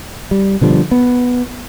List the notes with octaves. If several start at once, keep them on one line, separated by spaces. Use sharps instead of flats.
G3
B2 D3 F3 G3
B3